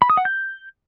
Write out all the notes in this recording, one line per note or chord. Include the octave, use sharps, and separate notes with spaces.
B5
D#6
F#5
G6